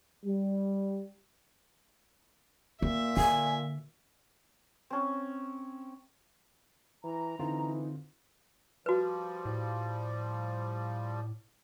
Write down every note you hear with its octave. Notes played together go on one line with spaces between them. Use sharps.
G3
A#2 A#3 E5
D3 G#5
C4 C#4
E3 A#5
D3 E3 C4 D#4 F4
F3 G3 F#4 B4
A2